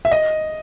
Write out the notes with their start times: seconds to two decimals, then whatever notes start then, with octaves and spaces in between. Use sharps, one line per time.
0.05 E5
0.11 D#5